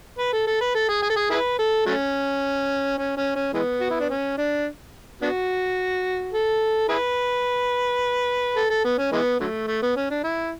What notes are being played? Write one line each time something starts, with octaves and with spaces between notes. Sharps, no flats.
B4
A4
A4
B4
A4
G#4
G#4
A4
G#4
E4 G#4 B4
A4
F#3 A3 C#4
C#4
C#4
C#4
E3 G#3 B3
F#4
E4
D4
C#4
D4
B3 D4 F#4
A4
E4 G#4 B4
A4
A4
B3
C#4
E3 G#3 B3
D3 F#3 A3
A3
B3
C#4
D4
E4